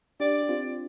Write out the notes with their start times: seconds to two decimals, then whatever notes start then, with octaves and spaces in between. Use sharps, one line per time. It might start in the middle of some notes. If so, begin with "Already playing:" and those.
0.20 D4 G4 D5
0.43 G4
0.49 C4 F4